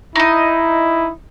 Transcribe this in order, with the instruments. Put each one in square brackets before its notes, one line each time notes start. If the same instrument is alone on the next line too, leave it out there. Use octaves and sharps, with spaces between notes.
[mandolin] D#4 D#5 [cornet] E4